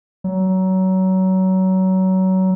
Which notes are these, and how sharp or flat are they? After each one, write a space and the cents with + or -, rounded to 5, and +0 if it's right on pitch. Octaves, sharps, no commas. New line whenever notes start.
F#3 +25